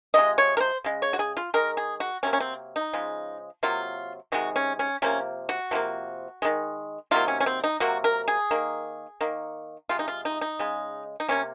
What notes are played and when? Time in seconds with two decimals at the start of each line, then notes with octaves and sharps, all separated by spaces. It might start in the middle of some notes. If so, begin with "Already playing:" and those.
0.14 C3 F3 G#3 D#5
0.38 C#5
0.57 A#4
0.60 C5
0.84 C#3 G#3
1.02 C#5
1.13 F#4
1.19 G#4
1.37 F4
1.54 D#3 G#3 A#4
1.77 G#4
2.00 F#4
2.23 C3 F#3 A#3 C#4
2.33 C#4
2.40 C4
2.76 D#4
2.93 C#3 F3 G#3
3.63 C3 F#3 A#3 F4
4.32 C3 D#3 G#3 F#4
4.56 C#4
4.79 C#4
5.02 C3 F3 A#3 C#4
5.49 F#4
5.71 C3 F3 A#3
6.42 D#3 G#3
7.11 C3 D#3 F#3 A#3 F4
7.28 C#4
7.40 C#4
7.46 C4
7.64 D#4
7.80 C3 F#3 A#3 F#4
8.04 A#4
8.28 G#4
8.51 D#3 A#3
9.21 D#3 A#3
9.89 C3 F3 G#3 F4
9.99 D#4
10.08 F4
10.25 D#4
10.41 D#4
10.59 C#3 G#3
11.20 D#4
11.28 C3 D#3 A#3 C#4